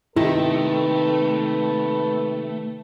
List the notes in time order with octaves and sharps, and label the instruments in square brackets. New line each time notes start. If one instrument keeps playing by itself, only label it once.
[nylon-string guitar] C3 D#3 [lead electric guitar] A3 [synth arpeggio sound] E4 [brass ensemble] A4 B4